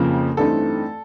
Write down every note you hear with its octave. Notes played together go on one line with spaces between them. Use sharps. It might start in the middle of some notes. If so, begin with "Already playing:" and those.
Already playing: F2 C#3 F3 A#3
G2 E3 A3 C4 D#4 A4